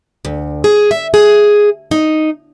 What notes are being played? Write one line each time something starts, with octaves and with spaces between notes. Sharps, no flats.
D2
G#4
E5
G#4
D#4